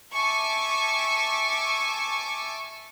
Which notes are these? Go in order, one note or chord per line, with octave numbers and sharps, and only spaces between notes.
E5 G#5 A5 C#6 D6